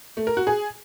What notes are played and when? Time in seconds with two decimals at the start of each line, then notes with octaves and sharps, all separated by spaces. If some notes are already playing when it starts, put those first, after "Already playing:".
0.17 A3
0.27 A#4
0.37 F#4
0.47 G#4